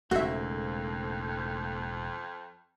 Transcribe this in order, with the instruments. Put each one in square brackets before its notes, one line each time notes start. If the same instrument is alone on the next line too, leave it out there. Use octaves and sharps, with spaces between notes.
[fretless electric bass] E1 G#2 C#3 [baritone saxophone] F2 [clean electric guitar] A3 A#3 [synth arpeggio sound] F#4 E5